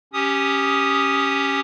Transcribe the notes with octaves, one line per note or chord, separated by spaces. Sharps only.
C#4 G4 D#6